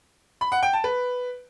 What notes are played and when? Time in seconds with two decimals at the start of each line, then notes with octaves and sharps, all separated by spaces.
0.41 B5
0.52 F#5
0.63 G5
0.73 A5
0.84 B4